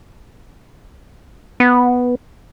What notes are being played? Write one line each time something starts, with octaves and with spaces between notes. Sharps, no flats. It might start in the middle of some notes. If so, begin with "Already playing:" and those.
B3